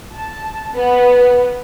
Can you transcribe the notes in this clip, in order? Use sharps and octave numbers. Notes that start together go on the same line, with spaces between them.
A5
B3